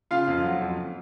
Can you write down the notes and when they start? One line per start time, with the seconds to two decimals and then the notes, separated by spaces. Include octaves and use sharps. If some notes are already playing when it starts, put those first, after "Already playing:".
0.11 C#3 F4 F5
0.28 F2
0.44 F#3
0.61 F2